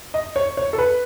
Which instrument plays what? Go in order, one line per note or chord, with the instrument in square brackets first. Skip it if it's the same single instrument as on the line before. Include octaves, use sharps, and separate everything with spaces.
[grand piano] D#5
C#5
C#5
A4
B4